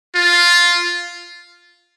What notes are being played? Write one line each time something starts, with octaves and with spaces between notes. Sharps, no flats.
F4